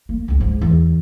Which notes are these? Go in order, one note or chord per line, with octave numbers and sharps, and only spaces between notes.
A#3
C#2 F#2
G#2
E2